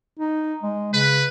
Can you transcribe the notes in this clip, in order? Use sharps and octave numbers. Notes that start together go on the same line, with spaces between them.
D#4
G#3
C#3 B4